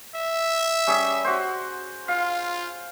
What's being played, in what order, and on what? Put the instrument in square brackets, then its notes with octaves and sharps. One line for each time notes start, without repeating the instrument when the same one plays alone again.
[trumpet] E5
[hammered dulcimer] G3 C#4 G#4
F#4 C5
[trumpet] F4 [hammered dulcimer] F5